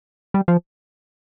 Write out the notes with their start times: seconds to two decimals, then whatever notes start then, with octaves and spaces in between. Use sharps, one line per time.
0.34 G3
0.48 F3